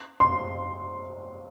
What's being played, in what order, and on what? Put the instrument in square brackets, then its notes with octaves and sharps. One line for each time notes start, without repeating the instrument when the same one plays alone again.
[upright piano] C6